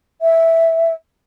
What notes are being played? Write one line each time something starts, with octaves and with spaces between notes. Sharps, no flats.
E5